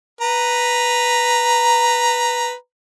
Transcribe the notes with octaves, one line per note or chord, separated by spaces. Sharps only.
B4 A#5